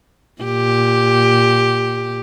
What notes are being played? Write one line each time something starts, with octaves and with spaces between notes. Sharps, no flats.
A#2 G4